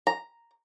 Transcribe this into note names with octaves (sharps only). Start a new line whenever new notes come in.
A#5